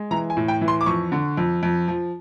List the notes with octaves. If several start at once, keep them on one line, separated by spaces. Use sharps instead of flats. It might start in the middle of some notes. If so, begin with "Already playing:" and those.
Already playing: G#3
E3 A#5
G#5
A2
G5
E3
C6
D6
F2 C#6
D3
F2
F2
F3